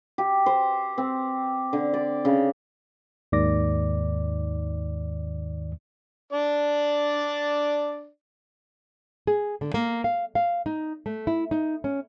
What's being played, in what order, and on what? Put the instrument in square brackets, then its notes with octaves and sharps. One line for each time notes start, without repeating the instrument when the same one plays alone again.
[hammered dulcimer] G4
C5
C4
D3
D5
C#3
[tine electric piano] D#2 G#2 D#3 D5 D6 A#6
[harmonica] D4 D5
[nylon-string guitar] G#4
D3
A#3
F5
F5
D#4
A3
E4
D#4
C#4